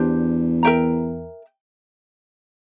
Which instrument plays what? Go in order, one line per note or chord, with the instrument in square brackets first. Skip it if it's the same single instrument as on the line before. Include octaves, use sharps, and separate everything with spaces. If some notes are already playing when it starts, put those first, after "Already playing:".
Already playing: [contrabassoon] E2 [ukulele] D4 G4 C5
[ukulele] A#4 E5 G5 A#5